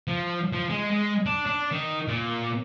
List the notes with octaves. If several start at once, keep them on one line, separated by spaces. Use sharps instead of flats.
F3
F3
G#3
G#3
D4
D4
D#3
A#2